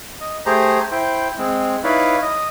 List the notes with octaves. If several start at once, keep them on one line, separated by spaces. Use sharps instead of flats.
D#5
A3 G4 G#4 C5 A#5
E4 C5 G5
G#3 C4
D#4 E4 B4 C#5 D5 F5
D#5